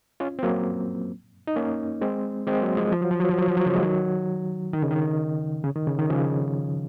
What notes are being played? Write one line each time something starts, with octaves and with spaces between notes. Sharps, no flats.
C#4 F4
C4
F#3 A#3
D#4
A#3 C#4
G#3 C4
G#3 C4
F#3 A#3
F3 G#3
F3
F#3
F3
F#3
F3
F#3
F3
F#3
C#3 F3
G#3
D#3 F#3
D#3
C#3
D#3
C#3
D#3
C#3
D#3
C#3 F3